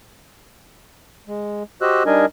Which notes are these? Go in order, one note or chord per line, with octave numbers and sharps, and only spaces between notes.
G#3
F#4 G4 C5 D#5 E6 F#6
G3 D4 D#4 A#4 D#5 G#5